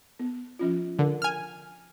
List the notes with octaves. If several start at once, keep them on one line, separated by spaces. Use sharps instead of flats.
B3
F3 C#4 F4
D3 A#4
G#5 F6